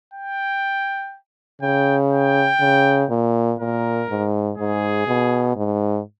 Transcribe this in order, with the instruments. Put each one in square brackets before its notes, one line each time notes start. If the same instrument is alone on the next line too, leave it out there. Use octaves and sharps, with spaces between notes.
[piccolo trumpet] G5
[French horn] C#3 [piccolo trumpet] G5
[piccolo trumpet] G5
[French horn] C#3
A#2
[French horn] A#2 [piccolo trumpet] A#4
[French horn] G#2
[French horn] G#2 [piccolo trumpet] G#4
[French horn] B2
G#2